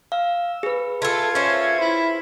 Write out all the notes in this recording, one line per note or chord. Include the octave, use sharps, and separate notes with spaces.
F5 E6
G#4 B4
A3 F4 A4 G#6
C#4 C5 E5
E4